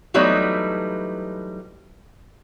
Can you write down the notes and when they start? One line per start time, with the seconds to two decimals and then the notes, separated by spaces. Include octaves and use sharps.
0.14 E3 F#3 G3 A3 B3 D#4